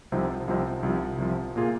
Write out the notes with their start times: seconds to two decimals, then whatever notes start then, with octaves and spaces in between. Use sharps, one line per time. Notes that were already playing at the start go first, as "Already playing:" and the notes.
0.12 C2 C3 F3 C4 D#4
0.48 C2 C3 F3 C4 D#4
0.83 C2 C3 F3
1.18 C2 C3 F3
1.56 A#2 A#3 F4 G#4